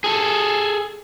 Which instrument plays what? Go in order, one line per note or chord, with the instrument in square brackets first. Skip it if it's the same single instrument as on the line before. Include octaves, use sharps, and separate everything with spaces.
[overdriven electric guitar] G#4 A4